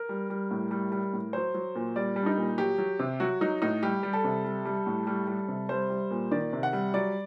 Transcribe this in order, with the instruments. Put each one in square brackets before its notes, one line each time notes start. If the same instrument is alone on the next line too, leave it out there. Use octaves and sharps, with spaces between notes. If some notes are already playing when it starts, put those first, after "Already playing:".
Already playing: [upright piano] A#4
G3
G3
A2
G3
G3
A2
F#3 C5
F#3
A#2
G3 D5
G3
D4
D#4
A#2
F#3 G4
F#3
C3
F#3 F#4
F#3 D#4
A2 D#4
G3 G4
G3
A4
C3
G3
G3
A2
G3
G3
C3
G3 C5
G3
A#2
D#3 D5
C3
F#5
G3
F#3 D5